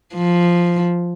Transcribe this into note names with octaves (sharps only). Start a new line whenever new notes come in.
F3